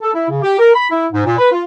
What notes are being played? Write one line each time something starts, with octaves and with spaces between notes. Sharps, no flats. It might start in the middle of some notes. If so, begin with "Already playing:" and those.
A4
E4
C#3
G4
A#4
B5
E4
G#2
A#2
B4
F4